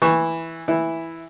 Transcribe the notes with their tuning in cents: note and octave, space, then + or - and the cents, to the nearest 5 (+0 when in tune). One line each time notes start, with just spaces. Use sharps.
E3 +0 C#6 +0
E3 +0 E4 +0